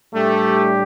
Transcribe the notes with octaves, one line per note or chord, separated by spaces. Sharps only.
A2 G3 A3 D4 G4